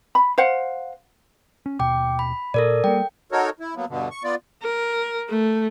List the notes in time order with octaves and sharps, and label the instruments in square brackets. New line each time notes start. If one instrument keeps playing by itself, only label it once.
[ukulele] B5
C5 F5 F#5
[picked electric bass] C#4
[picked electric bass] D#2 B2 [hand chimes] G5 D6
[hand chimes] B5
[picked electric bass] A#2 [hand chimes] A4 A#4 D5
[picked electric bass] G3 A#3 [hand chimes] G5
[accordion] D#4 F#4 A4 A#4 C#5
E4
F#3 A#3 B3
G2 B2 D3
C#6
B3 F4 D5
[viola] A#4
A3